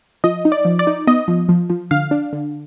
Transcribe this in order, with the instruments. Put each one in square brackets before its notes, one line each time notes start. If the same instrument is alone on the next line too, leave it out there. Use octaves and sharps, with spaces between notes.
[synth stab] F3 D#5
D#4
D5
F3
D5
D#4
B3 D#5
F3
F3
F3
D3 F5
D4
D3